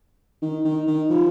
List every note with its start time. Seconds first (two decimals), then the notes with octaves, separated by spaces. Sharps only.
0.42 D#3
0.65 D#3
0.87 D#3
1.10 F3